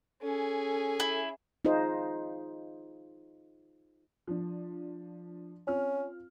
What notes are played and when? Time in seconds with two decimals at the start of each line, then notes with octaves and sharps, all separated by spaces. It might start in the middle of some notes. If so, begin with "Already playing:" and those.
0.22 C#4 G#4 A4
1.00 E4
1.65 D#4 F4 G#4 C5 D#5
4.27 F3 D4
5.67 C4 C#4 F4 F6